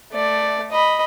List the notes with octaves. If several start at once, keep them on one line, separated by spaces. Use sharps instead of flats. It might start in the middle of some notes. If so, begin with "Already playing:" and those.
A3 D5
D#5 B5